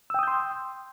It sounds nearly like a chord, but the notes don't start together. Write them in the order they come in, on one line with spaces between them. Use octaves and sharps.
E6 G5 D#6 G6 C6